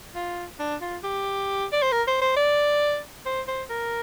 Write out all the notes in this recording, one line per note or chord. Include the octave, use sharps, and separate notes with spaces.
F4
D4
F4
G4
D5
C5
A#4
C5
C5
D5
C5
C5
A#4